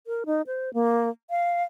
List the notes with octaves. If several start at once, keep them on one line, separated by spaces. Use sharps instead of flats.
A#4
D#4
C5
A#3
F5